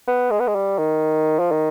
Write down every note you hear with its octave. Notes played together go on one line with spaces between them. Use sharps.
B3
G#3
B3
G#3
G3
D#3
F3
D#3